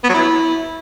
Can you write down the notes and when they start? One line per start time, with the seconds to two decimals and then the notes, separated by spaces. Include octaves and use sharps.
0.04 B3
0.09 F#3
0.14 E4